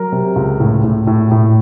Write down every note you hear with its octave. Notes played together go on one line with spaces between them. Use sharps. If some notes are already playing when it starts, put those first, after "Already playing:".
Already playing: F#3 A#4
C3
C#2
A2
A2
A2
A2